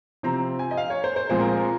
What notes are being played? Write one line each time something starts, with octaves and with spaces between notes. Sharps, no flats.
C3 F3 C4 A#5
G#5
D#5
F5
C#5
C5
C5
A#2 F3 G#3 C4 C5
A#4
A#4